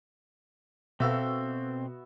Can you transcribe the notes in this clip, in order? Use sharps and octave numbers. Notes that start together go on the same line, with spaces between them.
B2 B3 C4 F#4 A4 E5 F5 A#5